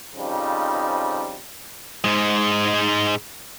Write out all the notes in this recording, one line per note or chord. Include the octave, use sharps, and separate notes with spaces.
F2 C#3 F3 G3 D#4
G#2 G#3